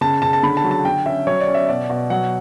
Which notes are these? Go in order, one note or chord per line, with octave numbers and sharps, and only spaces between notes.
C#3 A5
C#3 A5
A5
D3 B5
A5
F#3
A5
D3 G5
C#4 E5
F#3 C#5
D5
C#4
E5
B2 D5
B2
F#3 F#5